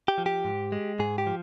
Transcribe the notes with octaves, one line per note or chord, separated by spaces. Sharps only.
G4
F3
G4
G#2
G#3
G#2 G#4
G4
F3